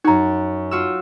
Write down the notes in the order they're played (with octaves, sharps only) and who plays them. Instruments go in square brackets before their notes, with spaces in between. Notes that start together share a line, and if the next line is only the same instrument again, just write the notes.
[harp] F#2 F#4 [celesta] D#4 A#5
[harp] F4 F#4 E6